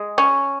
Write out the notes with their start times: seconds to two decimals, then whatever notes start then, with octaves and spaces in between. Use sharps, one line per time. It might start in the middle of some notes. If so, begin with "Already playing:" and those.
Already playing: G#3
0.18 C#4